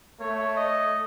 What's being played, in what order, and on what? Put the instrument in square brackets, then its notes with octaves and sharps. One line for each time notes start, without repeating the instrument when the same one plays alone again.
[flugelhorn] A3 [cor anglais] C#5
[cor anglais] D#5